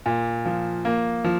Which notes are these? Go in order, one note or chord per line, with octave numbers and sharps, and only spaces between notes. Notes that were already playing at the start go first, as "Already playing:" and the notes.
A#2
F3
A#3
F3